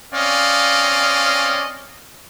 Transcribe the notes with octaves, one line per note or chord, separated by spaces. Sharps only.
C4 C#4 D5 D#5 F5